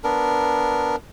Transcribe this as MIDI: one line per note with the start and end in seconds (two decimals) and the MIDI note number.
0.04 0.96 59
0.04 0.96 62
0.04 0.96 70